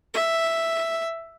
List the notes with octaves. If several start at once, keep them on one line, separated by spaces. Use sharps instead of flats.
E5